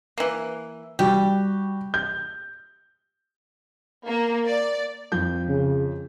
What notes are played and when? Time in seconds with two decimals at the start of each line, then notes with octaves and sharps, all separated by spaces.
0.18 E3 A#3
0.99 G3 F#4 G4
1.94 G6
4.07 A#3
4.47 D5
5.12 F2 F3 G6
5.49 C#3